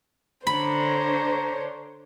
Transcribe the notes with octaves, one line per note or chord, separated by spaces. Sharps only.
D3 D4 C5 C#5 A#5 B5